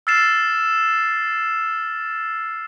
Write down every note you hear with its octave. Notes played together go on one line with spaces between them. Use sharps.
E6 F6 A6 C7 E7